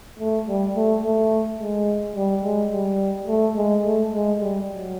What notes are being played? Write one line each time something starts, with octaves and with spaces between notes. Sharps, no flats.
A3
G3
A3
A3
G#3
G3
G#3
G3
A3
G#3
A3
G#3
G3
F#3